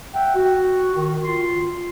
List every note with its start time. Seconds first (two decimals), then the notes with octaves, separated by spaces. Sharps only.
0.13 E5 F#5 G5
0.35 F#4
0.94 D#3
1.25 F4 C6